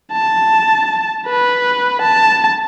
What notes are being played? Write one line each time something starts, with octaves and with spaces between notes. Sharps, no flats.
A5
B4
A5